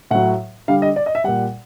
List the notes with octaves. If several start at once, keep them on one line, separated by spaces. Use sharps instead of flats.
A2 F#3 F#5
D3 G3 F5
D#5
D5
D#5
E5
A#2 G3 F#5